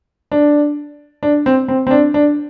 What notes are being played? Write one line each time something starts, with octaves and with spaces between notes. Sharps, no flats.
D4
D4
C4
C4
C4
D4
D4